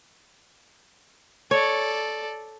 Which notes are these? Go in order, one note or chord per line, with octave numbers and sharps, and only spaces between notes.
A4 C#5 D5